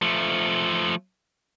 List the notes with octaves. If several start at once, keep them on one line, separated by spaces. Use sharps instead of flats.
F3 A3